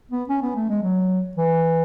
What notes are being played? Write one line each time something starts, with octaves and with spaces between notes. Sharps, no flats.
B3
C#4
B3
A3
G#3
F#3
E3